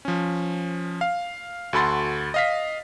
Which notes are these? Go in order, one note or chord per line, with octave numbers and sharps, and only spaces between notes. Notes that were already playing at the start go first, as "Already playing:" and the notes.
F3 C#4
F5
D2 F#4 A4 B5 C6 A6
D#5 F5 B6